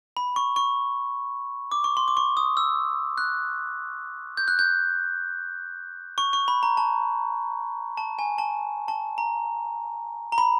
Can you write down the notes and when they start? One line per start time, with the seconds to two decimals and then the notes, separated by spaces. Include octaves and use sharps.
0.17 B5
0.36 C#6
0.56 C#6
1.72 D6
1.84 C#6
1.97 C6
2.08 D6
2.17 C#6
2.37 D#6
2.57 E6
3.18 F#6
4.37 G6
4.48 F#6
4.59 G6
6.18 C#6
6.33 C#6
6.48 B5
6.63 A#5
6.77 A5
7.97 A5
8.19 G#5
8.38 A5
8.88 A5
9.18 A#5
10.32 A#5
10.38 B5